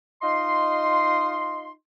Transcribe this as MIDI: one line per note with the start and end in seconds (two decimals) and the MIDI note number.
0.22 1.71 63
0.22 1.71 65
0.22 1.71 75
0.22 1.71 84